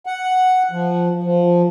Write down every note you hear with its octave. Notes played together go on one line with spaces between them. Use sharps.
F#5
F3
F3